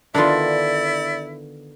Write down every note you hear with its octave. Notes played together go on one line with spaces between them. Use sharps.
D3 D#3 B3 D4 E4 F4 D5